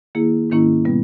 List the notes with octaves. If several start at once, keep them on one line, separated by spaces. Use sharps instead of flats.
D#3 A#3 E4 G#4
G#2 D#3 A#3 C#4 E4
B2 G3 B3